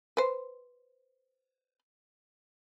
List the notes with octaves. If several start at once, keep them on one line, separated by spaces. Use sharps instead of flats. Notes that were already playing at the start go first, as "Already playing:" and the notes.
B4 C5